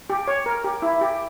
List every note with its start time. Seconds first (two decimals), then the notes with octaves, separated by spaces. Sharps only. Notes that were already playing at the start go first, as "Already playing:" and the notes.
0.10 G4
0.28 C#5
0.46 A#4
0.64 G4
0.82 E4
1.01 G4